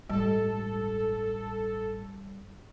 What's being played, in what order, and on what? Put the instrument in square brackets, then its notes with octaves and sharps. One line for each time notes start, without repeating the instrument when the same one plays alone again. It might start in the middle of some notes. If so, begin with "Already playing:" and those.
[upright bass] A1 G#3 [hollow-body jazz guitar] G2 [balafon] G3 [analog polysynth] A4